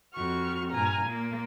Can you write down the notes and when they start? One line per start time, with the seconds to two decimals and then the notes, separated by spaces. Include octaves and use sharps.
0.14 F2 F#4 C#6 F6
0.70 G2 A#2 G#5 A#5 F6
1.06 A#2 A#3